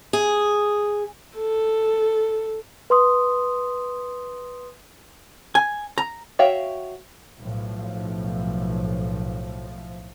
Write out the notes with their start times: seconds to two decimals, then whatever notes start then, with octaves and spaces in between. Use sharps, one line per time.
0.13 G#4
1.37 A4
2.90 B4 C6 D#6
5.55 G#5
5.98 A#5
6.39 F#4 C#5 E5 F5 G5
7.41 B1 A2 F3